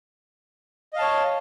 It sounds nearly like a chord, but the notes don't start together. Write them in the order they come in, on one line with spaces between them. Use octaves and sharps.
D#5 F5 A5 C#5